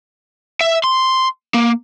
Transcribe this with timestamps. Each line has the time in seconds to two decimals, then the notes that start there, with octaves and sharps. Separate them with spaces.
0.61 E5
0.84 C6
1.54 A#3